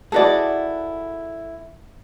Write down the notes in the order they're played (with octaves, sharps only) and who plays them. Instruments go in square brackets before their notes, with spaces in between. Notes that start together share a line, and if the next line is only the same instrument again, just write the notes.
[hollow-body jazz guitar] E4 F#4 G#4 [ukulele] A4 B4 D5